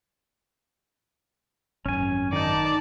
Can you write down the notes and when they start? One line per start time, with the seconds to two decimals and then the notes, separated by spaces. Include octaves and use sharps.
1.86 G#1 F#2 C#4 G#5
2.33 D#3 D#4 D5 A5